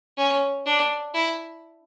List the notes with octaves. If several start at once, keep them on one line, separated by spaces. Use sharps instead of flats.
C#4
D4
E4